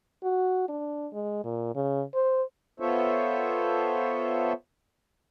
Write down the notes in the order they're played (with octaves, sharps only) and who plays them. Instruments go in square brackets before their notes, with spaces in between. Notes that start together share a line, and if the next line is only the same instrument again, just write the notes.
[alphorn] F#4
D4
G#3
A#2
C#3
C5
[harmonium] B3 F4 A4 C5 C#5 E5